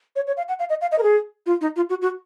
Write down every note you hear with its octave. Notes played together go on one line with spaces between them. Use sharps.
C#5
C#5
F5
F#5
F5
D#5
F5
D#5
A#4
G#4
F4
D#4
F4
F#4
F#4